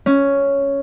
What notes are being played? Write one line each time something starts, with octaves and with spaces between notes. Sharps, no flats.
C#4